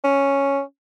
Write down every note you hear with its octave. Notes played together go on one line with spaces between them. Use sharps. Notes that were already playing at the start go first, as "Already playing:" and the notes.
C#4